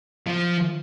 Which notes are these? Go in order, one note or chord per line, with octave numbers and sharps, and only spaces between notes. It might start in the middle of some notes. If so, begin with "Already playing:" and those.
F3